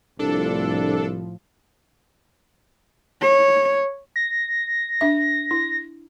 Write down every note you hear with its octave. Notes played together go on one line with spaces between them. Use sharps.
C2 A2 F3 D4 A4
C#5
A#6
D4 E5
E4